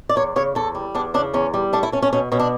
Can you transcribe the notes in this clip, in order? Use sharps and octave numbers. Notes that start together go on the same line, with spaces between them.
D5
E2 C#5
C#3 C#5
E2 A4
G3
E2 D4
C#3 D4
E2 C#4
G3
A3 D4
E4
A3 C#4
C#4
B2 C#4
B2 C#4
D4